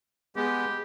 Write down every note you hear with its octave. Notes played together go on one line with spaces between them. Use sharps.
G#3 B3 G4 G#4